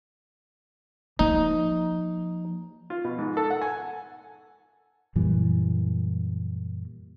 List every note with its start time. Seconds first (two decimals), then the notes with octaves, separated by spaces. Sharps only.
1.19 F3 A#3 D#4
2.90 F4
3.05 B2
3.18 G#2
3.37 A4
3.50 F#5
3.62 G#5
5.15 F#2 A#2 E3 G3